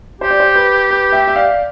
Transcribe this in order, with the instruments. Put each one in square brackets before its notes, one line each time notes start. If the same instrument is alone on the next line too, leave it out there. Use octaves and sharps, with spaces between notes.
[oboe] G4 [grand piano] C5
[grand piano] D5
C5
B4
B4
E5 G5
E5
D5 F5